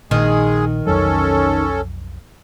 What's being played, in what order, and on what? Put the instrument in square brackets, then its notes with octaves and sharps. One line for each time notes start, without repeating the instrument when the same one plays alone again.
[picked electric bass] A#1 A#2 [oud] D#3 [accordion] G#3 G#4
[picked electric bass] B1 F2 F#3 [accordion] C#4 A4